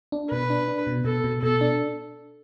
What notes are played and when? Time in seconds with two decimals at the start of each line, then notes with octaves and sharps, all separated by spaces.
0.12 D4
0.31 B2 B4
0.50 D4
0.68 D4
0.87 B2
1.05 B2 A4
1.24 B2
1.43 B2 A4
1.61 D4